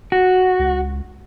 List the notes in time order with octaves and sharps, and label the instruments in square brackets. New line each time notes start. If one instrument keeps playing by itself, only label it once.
[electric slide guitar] F#4
[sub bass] C#2